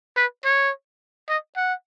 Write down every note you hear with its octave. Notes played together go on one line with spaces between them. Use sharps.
B4
C#5
D#5
F#5